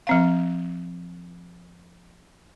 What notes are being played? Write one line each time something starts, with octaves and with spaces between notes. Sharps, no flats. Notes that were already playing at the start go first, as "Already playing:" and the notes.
F3 C4 F5